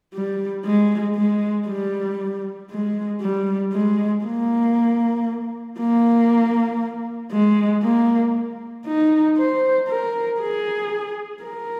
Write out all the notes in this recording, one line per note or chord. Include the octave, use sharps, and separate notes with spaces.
G3
G#3
G#3
G3
G#3
G3
G#3
A#3
A#3
G#3
A#3
D#4
C5
A#4
G#4
A#4